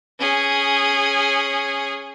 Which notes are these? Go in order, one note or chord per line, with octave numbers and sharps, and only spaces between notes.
C#4 G#4